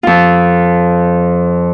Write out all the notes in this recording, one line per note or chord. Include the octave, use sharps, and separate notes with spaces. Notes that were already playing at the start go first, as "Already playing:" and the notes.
F2 F4